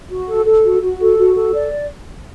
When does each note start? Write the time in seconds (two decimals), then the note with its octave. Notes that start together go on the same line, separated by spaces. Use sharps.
0.10 F#4
0.28 A4
0.46 A4
0.64 F#4
0.81 F#4
1.00 A4
1.17 F#4
1.35 A4
1.53 D5